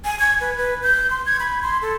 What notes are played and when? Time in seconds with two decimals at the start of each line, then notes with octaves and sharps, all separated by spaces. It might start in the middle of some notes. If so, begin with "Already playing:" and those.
0.05 G#5
0.20 G#6
0.41 B4
0.58 B4
0.83 G6
1.10 C6
1.26 G#6
1.40 B5
1.62 C6
1.82 A4